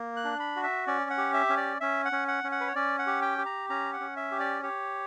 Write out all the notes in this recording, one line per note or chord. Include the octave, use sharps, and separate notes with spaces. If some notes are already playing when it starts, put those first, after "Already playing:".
Already playing: A#3
F#6
D4
B5
F#4
E5
C#4 D5
F#5
G4
E5
C#4
D5
C#4 E5
F#5
C#4
F#5
C#4
F#5
B4
C#5
C#4 D5
F#5
G4
G5
G4
A#5
C#4 A#5
F#5
C#4
E5
G4
D5
G4 C#5